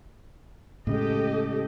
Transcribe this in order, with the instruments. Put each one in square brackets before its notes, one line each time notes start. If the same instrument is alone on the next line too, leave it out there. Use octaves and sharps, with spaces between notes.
[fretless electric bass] A2 C#3 G#3 [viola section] G4 A4 D#5